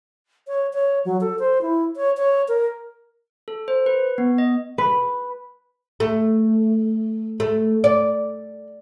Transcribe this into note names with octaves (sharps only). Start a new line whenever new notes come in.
C#5
C#5
F#3
A4
C5
E4
C#5
C#5
A#4
A4
C5
B4
B3
D#5
B4
A3
A3
D5